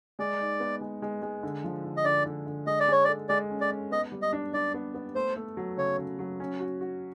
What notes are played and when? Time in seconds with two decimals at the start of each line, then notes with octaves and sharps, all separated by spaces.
0.19 G#3 D5
0.40 D#4
0.60 B3
0.81 G#3
1.02 G#3
1.22 G#3
1.43 D3
1.64 F3
1.84 D3
1.97 D#5
2.05 D3 D5
2.26 D3
2.47 D3
2.67 G#3 D#5
2.80 D5
2.88 G#3 C#5
3.04 D5
3.08 A4
3.29 G#3 D5
3.50 C#4
3.61 D5
3.71 C#4
3.91 B3 D#5
4.12 G3
4.22 D#5
4.33 D4
4.53 D4 D5
4.74 B3
4.94 B3
5.15 A3 C5
5.36 A3
5.57 F#3
5.77 C#3 C#5
5.98 C#3
6.19 F#3
6.40 C#4
6.60 F#4
6.81 F#4